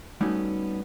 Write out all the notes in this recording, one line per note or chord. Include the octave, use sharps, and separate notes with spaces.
G3 A3 B3 C#4 D#4 F#4